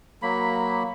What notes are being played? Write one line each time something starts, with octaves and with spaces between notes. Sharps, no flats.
F#3 A#3 B5